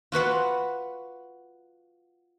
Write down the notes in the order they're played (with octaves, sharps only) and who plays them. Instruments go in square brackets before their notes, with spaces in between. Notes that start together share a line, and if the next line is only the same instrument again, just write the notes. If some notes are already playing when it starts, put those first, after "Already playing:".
[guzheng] F4 F#4 B4 F#5